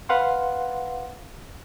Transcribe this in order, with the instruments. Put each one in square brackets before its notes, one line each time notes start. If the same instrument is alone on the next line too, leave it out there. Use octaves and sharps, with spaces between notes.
[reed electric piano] B4 F5 F#5 C6